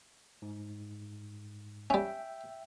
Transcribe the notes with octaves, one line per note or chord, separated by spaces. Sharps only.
G#2
G3 C#4 E5 G5